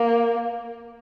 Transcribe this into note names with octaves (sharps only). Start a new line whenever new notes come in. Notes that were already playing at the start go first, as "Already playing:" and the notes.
Already playing: A#3